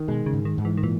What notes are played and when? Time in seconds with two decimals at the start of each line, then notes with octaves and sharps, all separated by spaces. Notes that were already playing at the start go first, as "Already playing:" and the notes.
Already playing: D#3
0.08 B2 G#3
0.26 C#3
0.33 G#2
0.45 D#3
0.58 G#2
0.65 E3
0.77 D#3
0.83 A#2 E3